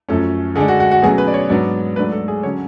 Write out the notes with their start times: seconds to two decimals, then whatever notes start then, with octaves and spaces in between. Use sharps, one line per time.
0.09 F#2 F3 A3 C#4 A4
0.56 D3 G#3 D4 G#4
0.68 F#4
0.80 F#4
0.91 F#4
1.02 B2 F#3 A3 C#4 G#4
1.18 B4
1.28 D5
1.34 C#5
1.49 G#2 F#3 B3 D4 D5
1.96 G#2 F#3 A3 D4 B4
2.12 A4
2.28 G#4
2.43 D3 F#3 C#4 C#5